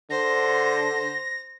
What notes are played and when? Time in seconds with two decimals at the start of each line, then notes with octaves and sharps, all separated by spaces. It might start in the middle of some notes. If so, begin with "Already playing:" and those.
0.10 D3 C5 A#6